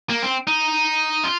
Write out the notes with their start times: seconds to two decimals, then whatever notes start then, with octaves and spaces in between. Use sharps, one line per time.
0.10 A#3
0.22 C4
0.47 D#4
1.24 F4